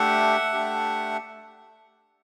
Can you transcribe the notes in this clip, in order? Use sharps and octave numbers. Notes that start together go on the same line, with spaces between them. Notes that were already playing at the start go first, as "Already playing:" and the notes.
Already playing: A3 D4 G4 E5 F#5
A3 D4 G4